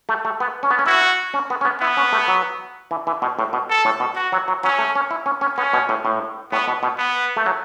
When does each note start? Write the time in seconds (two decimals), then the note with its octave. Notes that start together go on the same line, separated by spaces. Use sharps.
0.09 A3
0.25 A3
0.40 B3
0.63 C#4
0.71 B3
0.79 C#4
0.86 E4 F#4
1.34 C#4
1.50 B3
1.61 C#4
1.65 B3
1.80 B3 E4
1.97 C#4
2.13 A3
2.28 F#3
2.91 E3
3.07 E3
3.22 B2
3.39 A2
3.53 B2
3.70 A4
3.85 A2
4.00 B2
4.16 F#4
4.32 F#3
4.48 F#3
4.64 F#3 C#4
4.79 A3
4.95 C#4
5.11 E4
5.26 C#4
5.41 C#4
5.57 B3 C#4
5.73 B2
5.89 A2
6.05 A2
6.52 A2 B3
6.68 B2
6.83 B2
6.98 B3
7.37 A3
7.46 F#3